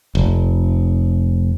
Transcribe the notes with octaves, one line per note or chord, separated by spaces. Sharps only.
F1